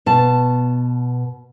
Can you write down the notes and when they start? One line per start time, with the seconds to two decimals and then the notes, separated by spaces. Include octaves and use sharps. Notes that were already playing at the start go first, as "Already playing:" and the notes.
0.06 B2 A5